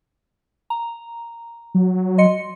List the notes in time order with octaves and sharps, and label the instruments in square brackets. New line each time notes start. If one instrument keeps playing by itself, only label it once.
[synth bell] A#5
[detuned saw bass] F#3
[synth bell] D#5 C6 C#7